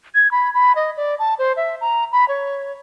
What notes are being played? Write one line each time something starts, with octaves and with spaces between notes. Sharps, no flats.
G#6
B5
B5
D#5
D5
A5
C5
E5
A#5
B5
C#5